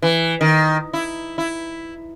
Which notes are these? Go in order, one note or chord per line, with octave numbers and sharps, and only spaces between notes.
E3
D#3
E4
E4